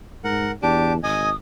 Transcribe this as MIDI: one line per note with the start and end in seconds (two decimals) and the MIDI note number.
0.24 0.52 44
0.24 0.51 70
0.24 0.51 78
0.63 1.03 40
0.63 0.93 62
0.63 0.93 67
0.63 0.96 81
0.63 0.93 86
1.03 1.34 32
1.03 1.29 75
1.03 1.29 80
1.03 1.35 87